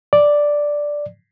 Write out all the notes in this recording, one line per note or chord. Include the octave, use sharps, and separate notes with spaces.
D5